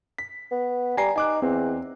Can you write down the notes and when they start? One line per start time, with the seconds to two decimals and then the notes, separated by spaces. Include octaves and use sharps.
0.18 B6
0.52 B3
0.97 G3 G#5 A#5 C7
1.16 D#4 G#5 D6 F#6
1.42 E2 C4